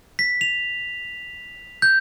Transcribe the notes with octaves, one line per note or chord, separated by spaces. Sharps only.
B6
F7
G6